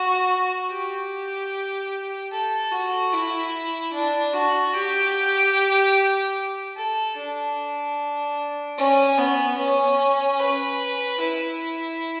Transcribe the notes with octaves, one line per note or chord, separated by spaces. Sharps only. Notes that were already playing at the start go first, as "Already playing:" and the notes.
Already playing: F#4
G4
A4
F#4
E4
D4
F#4
G4
A4
D4
C#4
B3
C#4
B4
E4